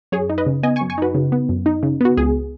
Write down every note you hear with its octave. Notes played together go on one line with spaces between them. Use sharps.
F#2 G#4 C#5
D#4
B4 D#5
C#3
B3 D#5 G#5
G#5 C#6
F#2
G#5 C#6
D#4 F#4 B4
C#3
B3
F#2
D#4
C#3
B3 F#4
C#2 G#4